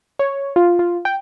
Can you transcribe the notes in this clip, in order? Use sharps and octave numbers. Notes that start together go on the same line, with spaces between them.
C#5
F4
F4
G5